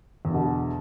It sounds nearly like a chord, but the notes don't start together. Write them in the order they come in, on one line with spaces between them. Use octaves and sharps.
E2 D3 B2